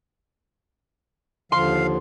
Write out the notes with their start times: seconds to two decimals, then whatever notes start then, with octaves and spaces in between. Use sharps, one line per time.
1.52 D#2 D3 F3 F5 C6